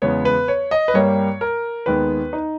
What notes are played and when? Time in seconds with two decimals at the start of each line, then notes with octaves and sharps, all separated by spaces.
0.02 E2 C#3 G#3 B3 C#5
0.25 B4
0.48 C#5
0.71 D#5
0.88 B4
0.94 G2 G3 A#3 C#5
1.41 A#4
1.86 D#2 D#3 G#3 B3 B4
2.33 D#4